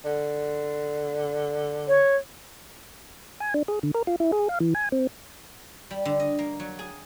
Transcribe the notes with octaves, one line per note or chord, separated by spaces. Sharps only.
D3
C#5
G#5
D4
G#4
D3
A#4
F4
E4
G#4
F5
E3
G#5
C4
G3
D3
D#5
A#3
F#3
G#4